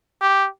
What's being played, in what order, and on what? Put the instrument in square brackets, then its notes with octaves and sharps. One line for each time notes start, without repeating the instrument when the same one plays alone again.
[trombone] G4